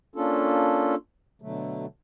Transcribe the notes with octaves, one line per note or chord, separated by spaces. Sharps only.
A#3 C#4 D4 F4 A4
B2 D3 F#3 A3